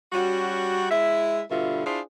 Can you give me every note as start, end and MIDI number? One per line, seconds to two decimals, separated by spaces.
0.13 0.85 55
0.13 0.85 61
0.13 0.85 66
0.90 1.41 56
0.90 1.41 64
0.90 1.41 76
1.50 1.83 43
1.50 1.83 47
1.50 1.83 50
1.50 1.83 65
1.50 1.83 76
1.86 1.99 62
1.86 1.99 64
1.86 1.99 65
1.86 1.99 68
1.86 1.99 72